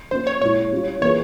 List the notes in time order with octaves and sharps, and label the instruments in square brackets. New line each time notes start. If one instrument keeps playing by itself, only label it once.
[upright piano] F3 A#3 C#4 [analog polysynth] C5
[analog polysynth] C#5
[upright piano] A#2 G#3 E4 [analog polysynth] C#5
[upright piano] G3 C#4 F4
[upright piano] E3 A#3 F4 G#4 [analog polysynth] C#5